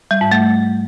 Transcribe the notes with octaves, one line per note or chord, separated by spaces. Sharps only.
G3
G#2
A3